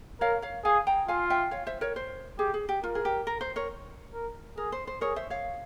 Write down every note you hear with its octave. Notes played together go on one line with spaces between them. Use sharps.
A#4 C#5 F5
C#5 F5
G#4 F5 G#5
G5 A#5
F4 F5 G#5
E5 G5
C#5 F5
C5 E5
A#4 C#5
C5
G4 G#4
G#4
G4
F4 A#4
G#4
G4
A#4
C5
A#4 C#5
A#4
G#4 A#4
C5
C5
G#4 A#4 C#5
C5 E5
C#5 F5